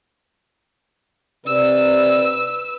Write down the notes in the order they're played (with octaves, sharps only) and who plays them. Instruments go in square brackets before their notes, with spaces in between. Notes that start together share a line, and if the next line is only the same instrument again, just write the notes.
[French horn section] C3 D5 [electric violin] B4 E6